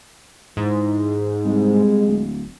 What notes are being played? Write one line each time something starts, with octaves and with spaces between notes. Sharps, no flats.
G#2 E3
C2 G#3
D1